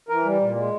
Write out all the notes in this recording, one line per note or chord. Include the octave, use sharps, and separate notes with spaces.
E3 A#4
G3
A#2
G#3